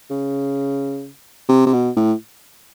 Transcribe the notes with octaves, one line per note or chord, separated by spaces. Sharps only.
C#3
C3
C3
B2
A2